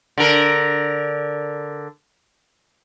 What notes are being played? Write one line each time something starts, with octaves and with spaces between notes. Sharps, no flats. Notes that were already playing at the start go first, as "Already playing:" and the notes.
D3 A#4